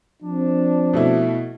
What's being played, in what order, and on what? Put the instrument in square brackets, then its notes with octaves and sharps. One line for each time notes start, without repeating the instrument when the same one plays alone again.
[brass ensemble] F3 C4 D4
[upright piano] B2 A3 E4